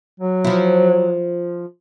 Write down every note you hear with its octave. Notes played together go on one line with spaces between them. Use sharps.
F#3
F3 E4